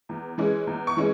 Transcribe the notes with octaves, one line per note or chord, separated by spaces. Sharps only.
E2
E3 G#3 C#4
E2
C#6
E3 G#3 C#4